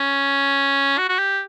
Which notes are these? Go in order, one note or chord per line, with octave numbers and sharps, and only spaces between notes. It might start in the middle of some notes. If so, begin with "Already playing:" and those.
Already playing: C#4
F#4
F#4
G4